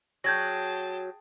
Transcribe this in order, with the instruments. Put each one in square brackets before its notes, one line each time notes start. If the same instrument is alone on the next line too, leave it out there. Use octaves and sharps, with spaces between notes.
[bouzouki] F#3 [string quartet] G#4 G5 A5 [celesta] G6 G#6 A#6